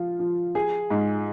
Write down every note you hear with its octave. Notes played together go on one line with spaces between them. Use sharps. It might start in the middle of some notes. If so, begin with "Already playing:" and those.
Already playing: F3 F4
F3
G#4
G#2